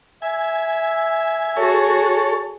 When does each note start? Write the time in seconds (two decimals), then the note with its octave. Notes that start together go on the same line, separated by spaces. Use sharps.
0.22 E5 G#5
1.57 F#4 G#4 A4 C#5